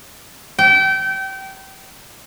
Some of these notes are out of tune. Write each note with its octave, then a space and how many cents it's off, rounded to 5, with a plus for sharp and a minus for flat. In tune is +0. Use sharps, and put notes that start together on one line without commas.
G5 -30